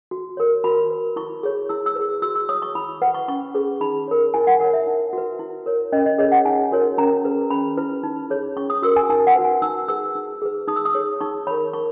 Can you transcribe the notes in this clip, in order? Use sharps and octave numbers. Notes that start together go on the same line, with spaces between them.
F#4
A#4 C#5
F#4 B5
B4
E4 C#6
G#4 C#5
E4 E6
E6
G#4 B4
F#4 E6
E6
C#5 D#6
C#6
E4 B5
B4 F#5
C#6
C#4 C#6
G#4 B4
D#4 B5
A#4 C#5
E4 G#5
F#5
A#4 C#5 F#5
E5
D#4
F#4 B4
E4
A#4 C#5
C#4 D#5
D#5
G#4 C#5 D#5
F#5
D#4 G#5
F#4 A#4 C#5
C#4 A#5
G#4 B4
C#4 B5
E4 B4
D#4
G#4 C#5
C#4 C#6
D#6
F#4 A#4 E6
G#5
D#4 G#5
F#5
F#4 B4
G#5
D#4 E6
G#4 B4 E6
D#4
G#4 B4
D#4 D#6
E6
D#6
G#4 C#5
D#4 C#6
A#4 C#5 B5
D#4 C#6